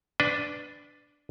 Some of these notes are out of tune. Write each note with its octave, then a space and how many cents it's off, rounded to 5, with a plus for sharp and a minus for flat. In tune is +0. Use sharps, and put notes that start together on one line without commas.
D4 +0 B4 +15